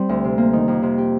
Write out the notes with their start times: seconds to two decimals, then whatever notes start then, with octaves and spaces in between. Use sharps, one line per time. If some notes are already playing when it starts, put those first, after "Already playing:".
Already playing: G3 C4
0.09 D2
0.24 C3
0.38 A#3
0.53 D#3
0.68 F2
0.82 C3
0.98 G4